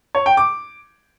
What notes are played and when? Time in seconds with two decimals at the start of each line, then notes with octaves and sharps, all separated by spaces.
0.15 C#5
0.26 G5
0.37 D6